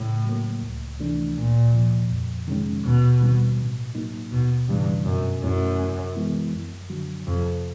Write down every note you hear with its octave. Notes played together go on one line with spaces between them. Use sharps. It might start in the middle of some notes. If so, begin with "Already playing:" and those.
Already playing: A2 C#3
F#3 A#3
C#2
C3 E3 A3 D4
D2 A#2
C3 F3
F2
C3 D#3 G#3 C#4
D#2 B2
D#3 G3 C4
A2
F#3 A#3 D#4
D#2 B2
G2 C#3 E3 G3
F#2 B2
F#2 F#3 A3 C#4 E4
C3
E3 G#3 B3 E4
F#2
D3 F#3
F2 C3